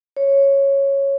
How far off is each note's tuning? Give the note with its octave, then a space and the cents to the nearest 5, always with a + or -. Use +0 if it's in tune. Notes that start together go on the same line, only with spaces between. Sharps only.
C#5 -10